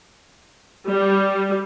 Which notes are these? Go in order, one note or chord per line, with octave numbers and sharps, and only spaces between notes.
G3